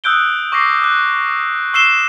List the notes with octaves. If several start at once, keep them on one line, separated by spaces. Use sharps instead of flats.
D#6 E6 F#6 G6 D7 G7
C#6 D6 A#6 C7
D6 F#6
C#6 E6 C7 E7 G7